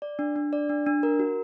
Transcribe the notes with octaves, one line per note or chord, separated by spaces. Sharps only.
D5
D4
D4
D5
D4
D4
A#4
F#4